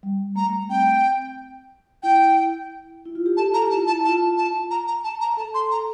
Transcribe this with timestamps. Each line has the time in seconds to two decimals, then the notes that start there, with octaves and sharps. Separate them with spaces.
0.03 G3
0.36 A3 A#5
0.44 G3
0.50 A3
0.69 C4 G5
2.03 E4 G5
3.05 E4
3.15 F4
3.26 G4
3.37 A4 A5
3.54 G4 A#5
3.66 E4
3.70 F4 A5
3.86 E4 A5
4.04 F4 A5
4.37 A5
4.71 A#5
4.87 A#5
5.04 A5
5.21 A#5
5.37 A4 A5
5.54 C6
5.71 A#5